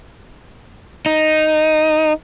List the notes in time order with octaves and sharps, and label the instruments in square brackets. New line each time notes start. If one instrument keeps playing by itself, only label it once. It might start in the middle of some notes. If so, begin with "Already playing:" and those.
[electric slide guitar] D#4